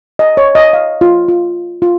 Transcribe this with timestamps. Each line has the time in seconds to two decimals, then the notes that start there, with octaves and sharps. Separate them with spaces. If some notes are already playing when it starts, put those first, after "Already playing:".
0.19 D#5
0.37 C#5
0.55 D#5
0.73 F5
1.01 F4
1.28 F4
1.82 F4